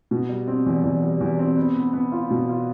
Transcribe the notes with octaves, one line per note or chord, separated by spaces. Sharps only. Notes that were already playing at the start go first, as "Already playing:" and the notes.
B2
G3
C4
E2
E2
G3
E2
C4
B3
B3
B3
F4
B2
F4